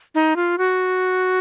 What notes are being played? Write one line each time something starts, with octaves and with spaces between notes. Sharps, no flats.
D#4
F4
F#4